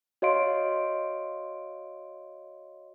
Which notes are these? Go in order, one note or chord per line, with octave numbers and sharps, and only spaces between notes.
F#4 C#5 D#5 F5 C6 D7